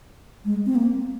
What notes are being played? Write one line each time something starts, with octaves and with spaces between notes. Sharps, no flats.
G#3
C4
A#3